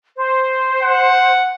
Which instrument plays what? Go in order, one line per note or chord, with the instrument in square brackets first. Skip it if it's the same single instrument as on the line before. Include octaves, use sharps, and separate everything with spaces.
[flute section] C5
[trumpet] F#5